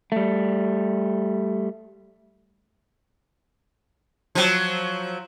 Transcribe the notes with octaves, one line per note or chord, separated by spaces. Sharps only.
G3 A3
F3 F#3